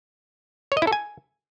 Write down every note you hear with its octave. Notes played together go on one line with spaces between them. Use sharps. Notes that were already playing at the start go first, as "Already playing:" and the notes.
C#5
D#5
E4
A4
G#5